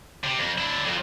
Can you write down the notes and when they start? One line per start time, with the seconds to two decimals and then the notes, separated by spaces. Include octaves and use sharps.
0.24 C3
0.39 F2
0.58 D4 E4
0.86 F2 F3